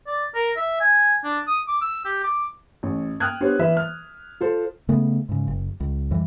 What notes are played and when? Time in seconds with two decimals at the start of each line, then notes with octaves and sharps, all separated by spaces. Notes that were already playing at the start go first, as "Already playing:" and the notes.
0.08 D5
0.35 A#4
0.57 E5
0.81 G#5
1.24 D4
1.47 D#6
1.68 D6
1.82 E6
2.05 G4
2.24 D6
2.83 A1
3.20 G5 D#6 F6 F#6 G#6
3.40 B3 D4 G4 C5 C#5
3.59 E3 B4 E5
3.77 F6
4.40 F4 A4 C5
4.89 C#3 A3 B3
5.29 G#2 C#3
5.48 F#1
5.80 C#2
6.11 F2 E3 G3